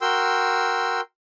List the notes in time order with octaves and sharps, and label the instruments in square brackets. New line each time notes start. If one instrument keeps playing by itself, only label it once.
[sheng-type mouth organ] F#4 A#4 G5 C6 E6